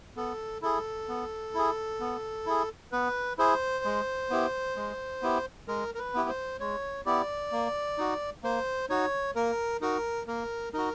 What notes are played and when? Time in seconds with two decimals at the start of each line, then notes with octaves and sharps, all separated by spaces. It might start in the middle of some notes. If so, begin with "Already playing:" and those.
0.17 B3 A4
0.62 E4 G#4 A4
1.09 B3
1.54 E4 G#4
2.00 B3
2.46 E4 G#4
2.92 B3 B4
3.38 E4 G#4 C5
3.85 G#3
4.30 B3 E4 G4
4.76 G#3
5.22 B3 E4 G4
5.68 G#3 A#4
5.95 A#4
5.99 B4
6.14 B3 E4 G4
6.29 C5
6.60 G#3 C#5
7.06 B3 E4 G4 D5
7.52 A#3
7.98 D#4 F#4
8.43 A#3 C5
8.90 D#4 F#4 C#5
9.35 A#3 A#4
9.81 D#4 F#4 A#4
10.27 A#3 A#4
10.73 D#4 F#4 A#4